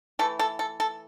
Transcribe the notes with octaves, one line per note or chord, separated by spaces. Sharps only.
E3 A3 A4
A4
A4
A4